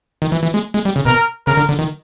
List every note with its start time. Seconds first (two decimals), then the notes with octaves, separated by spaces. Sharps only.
0.22 D#3
0.32 E3
0.43 E3
0.54 G#3
0.74 G#3
0.85 G3
0.96 C#3
1.05 B2 A#4
1.47 C#3 A#4
1.57 D3
1.69 D3
1.79 D#3